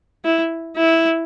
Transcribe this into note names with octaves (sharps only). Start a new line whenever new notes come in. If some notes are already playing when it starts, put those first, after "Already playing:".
E4
E4